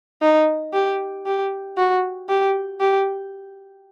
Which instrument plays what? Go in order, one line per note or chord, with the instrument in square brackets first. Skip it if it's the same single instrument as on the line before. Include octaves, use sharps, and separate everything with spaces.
[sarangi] D#4
G4
G4
F#4
G4
G4